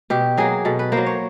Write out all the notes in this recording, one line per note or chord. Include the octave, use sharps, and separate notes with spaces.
B2 G4
F#3 A#3 G#4
B2 A4
B4
A#3 C5
F#3
C#5